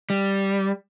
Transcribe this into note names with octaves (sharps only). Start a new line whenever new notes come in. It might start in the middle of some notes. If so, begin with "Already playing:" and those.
G3